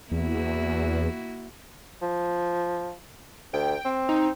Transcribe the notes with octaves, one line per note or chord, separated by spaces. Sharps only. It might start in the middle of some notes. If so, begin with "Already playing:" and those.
E2 A#3 E4 F#4
F3
D2 G5
C4
D#4